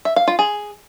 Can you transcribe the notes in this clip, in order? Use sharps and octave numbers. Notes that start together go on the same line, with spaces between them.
E5
F5
F4
G#4